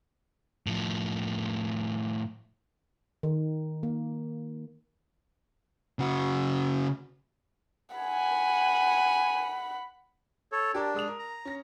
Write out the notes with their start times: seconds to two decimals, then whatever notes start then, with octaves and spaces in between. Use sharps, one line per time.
0.67 A2 F3
3.23 D#3
3.83 A#3
5.99 C#3 F#4
7.96 F#5 G#5 B5
10.52 A4 C#5
10.74 D4 G4 A#4 A5
10.94 G#3 D#6 F7
11.08 A#4
11.19 A#5
11.45 C#4 A#6